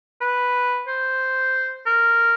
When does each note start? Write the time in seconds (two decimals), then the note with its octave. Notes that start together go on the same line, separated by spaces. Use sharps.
0.21 B4
0.87 C5
1.86 A#4